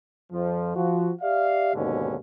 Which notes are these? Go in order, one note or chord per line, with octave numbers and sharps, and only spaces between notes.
F2 F3
F3 F#4
G4 D5 E5 F5
D#2 G#2 B2 D3 C#4